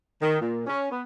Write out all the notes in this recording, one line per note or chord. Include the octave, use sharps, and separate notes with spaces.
D#3
A#2
C#4
B3